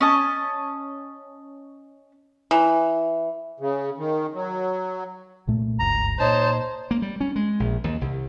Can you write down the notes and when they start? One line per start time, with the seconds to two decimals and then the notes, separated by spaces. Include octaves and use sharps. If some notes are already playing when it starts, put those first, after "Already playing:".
0.01 C#4 D#5 A5
2.51 E3
3.60 C#3
3.98 D#3
4.34 F#3
5.47 C2 A#2 A3
5.79 F#1 C#2 G2 A#5
6.20 A#2 D#4 C5 C#5 A5
6.91 A#3
7.02 G3
7.21 C#4
7.36 G#3
7.60 A#1
7.84 D#2
8.01 C2